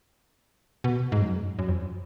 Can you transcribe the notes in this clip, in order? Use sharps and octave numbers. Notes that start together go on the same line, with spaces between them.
B2
G#2
F#2
F#2
F2